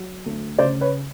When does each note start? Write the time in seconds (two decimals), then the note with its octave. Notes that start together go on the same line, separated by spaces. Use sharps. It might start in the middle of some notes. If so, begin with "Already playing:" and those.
Already playing: F#3
0.26 D2
0.58 C#3 C5 D5
0.81 B4 C#5